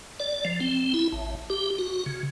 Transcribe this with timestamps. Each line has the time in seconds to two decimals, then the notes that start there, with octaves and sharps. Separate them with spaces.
0.20 D5
0.45 F3
0.60 C4
0.94 E4
1.12 A1
1.50 G4
1.78 F#4
2.06 C#3